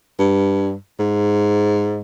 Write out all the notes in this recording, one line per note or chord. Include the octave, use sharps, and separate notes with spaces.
G2
G#2